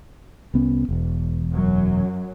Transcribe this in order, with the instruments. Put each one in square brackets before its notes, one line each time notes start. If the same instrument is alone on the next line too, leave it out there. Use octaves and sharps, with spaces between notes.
[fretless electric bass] C2 B3 C#4
E1 E2
[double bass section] F#2 F#3